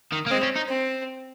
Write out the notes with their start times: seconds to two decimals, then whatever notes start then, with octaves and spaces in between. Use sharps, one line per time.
0.12 D#3
0.26 A#3
0.31 G#3 C4
0.43 C#4
0.56 D#4
0.68 C4